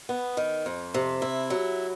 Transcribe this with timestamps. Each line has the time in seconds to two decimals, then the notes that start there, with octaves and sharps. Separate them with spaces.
0.09 B3
0.37 D#3
0.66 F2
0.94 C3
1.22 E4
1.50 F#3